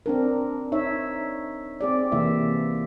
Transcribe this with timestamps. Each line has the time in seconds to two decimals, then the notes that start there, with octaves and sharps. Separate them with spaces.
0.06 C4 D4 A#4
0.72 D#4 C#5 E5
1.81 C4 G#4 D5
2.12 C3 E3 A#3 E5